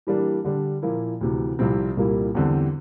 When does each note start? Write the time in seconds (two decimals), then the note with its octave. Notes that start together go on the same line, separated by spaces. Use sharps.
0.07 E3 G3 A#3 D4
0.44 D3 G3 D4
0.82 A#2 F3 A#3 E4
1.21 D2 C3 E3
1.59 C2 C3 F3 C4 E4
1.97 C2 A#2 G3 A#3 E4
2.35 E2 D3 G3 C4 G4